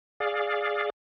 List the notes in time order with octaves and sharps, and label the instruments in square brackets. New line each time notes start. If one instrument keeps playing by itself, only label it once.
[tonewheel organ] G#4 D5 F5